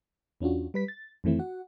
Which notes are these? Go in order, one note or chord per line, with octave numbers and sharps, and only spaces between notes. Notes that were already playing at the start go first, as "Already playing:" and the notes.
E2 C#4 D4 F4 F#4
G3 B4 B6
A6
F2 D#3 E3 A3 C4 E4
F#4 F#5